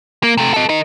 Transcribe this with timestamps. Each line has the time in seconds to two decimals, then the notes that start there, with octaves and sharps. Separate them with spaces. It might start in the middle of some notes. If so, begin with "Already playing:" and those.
0.23 A#3
0.38 C3 A3
0.54 A4 D#5
0.69 A#4 D#5